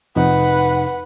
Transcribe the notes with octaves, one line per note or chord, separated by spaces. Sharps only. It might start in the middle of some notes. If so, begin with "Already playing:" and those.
F2 C3 D#4 B4 F#5